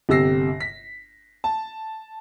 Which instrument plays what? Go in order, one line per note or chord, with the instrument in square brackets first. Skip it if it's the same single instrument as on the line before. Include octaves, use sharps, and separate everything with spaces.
[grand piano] G1 C3 G4 E6 A#6 C7
B6
A5